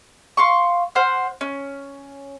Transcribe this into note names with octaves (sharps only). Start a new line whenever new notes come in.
F5 C6 C#6
C5 F#5 F6
C#4